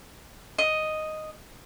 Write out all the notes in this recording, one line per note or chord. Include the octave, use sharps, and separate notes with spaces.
D#5